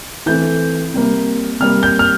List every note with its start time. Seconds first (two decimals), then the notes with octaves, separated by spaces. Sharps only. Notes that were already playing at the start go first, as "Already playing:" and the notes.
0.26 E3 A3 C4 G6
0.94 C3 G3 A#3
1.60 C3 G3 A#3 F6
1.83 G6
1.99 F6